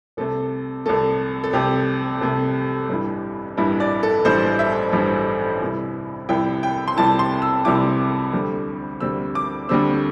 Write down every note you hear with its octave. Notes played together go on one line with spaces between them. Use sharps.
C2 C3 A3 A4
C2 C3 A3 A4
A4
C2 C3 A3 G4
C2 C3 A3
A1 G2 G3 E4
A1 G2 G3 E4
D5
A4
A1 G2 G3 E4 C5
E5
A1 G2 G3 E4
C2 C3 G3 E4
C2 C3 G3 E4 G5
G5
C6
C2 C3 G3 E4 A5
C6
E6
C2 C3 G3 E4 D6
D2 D3 G3 C4
D2 D3 G3 C4 E6
D6
D2 D3 G3 C4 E6